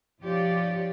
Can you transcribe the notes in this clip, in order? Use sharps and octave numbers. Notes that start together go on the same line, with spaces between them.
F3 D#4 F4 G4 C#5 D5